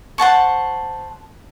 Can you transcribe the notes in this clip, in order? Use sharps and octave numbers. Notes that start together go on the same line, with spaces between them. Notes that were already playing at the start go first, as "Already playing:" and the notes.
C5 F#5 A5 C#6